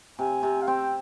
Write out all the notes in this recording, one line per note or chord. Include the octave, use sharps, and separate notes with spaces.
C3 G#5
C3
F5
C4 G5